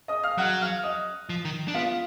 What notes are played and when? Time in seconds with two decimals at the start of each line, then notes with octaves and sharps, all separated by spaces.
0.08 D#5 D#6
0.23 F5 F6
0.38 F#3 F#5 F#6
0.61 F5 F6
0.84 D#5 D#6
1.29 F3
1.45 D#3
1.68 D4
1.74 B3 F4 F5